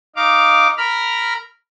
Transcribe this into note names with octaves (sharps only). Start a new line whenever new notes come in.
D#4 F5 D6
A#4 A#5 B5 F6